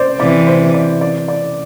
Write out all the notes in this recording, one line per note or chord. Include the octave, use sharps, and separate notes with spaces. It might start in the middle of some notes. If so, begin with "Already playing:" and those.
Already playing: C5 D5
C3 E3 D5
C5
D5
D5
D5